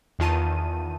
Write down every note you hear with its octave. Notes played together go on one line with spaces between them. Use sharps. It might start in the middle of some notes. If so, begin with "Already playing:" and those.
E2 D#3 F4 A5 D#7